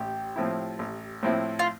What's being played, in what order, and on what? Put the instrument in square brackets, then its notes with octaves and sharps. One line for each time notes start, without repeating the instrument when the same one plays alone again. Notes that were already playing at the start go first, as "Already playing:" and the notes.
Already playing: [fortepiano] A1 [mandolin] G4
[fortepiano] A2 F3 C4 E4
A1
A2 F3 C4 E4
[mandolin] F4